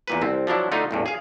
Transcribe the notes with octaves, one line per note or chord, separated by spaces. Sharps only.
E2 A#2 B4
C2 C4
F3 F#3 D4 E4
D3 A3 D#4 F4
A1 E2 G2
G#4 F5